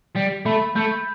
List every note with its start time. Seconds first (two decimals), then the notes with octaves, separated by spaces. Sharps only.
0.15 G3
0.46 A3 B5
0.76 A3 G6